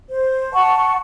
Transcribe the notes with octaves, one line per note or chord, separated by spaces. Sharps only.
C5
F#5 A5 C#6